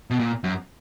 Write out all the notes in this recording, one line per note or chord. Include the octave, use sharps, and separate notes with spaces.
B2
A#2
F#2